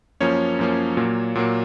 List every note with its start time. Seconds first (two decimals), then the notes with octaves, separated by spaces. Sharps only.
0.20 F#2 F3 A#3 C#4 C#5
0.59 F#2 F3 A#3 C#4
0.97 A#2 F#3 A#3
1.35 A#2 F#3 A#3